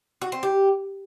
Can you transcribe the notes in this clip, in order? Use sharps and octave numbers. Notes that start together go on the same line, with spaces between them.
F#4
C4
G4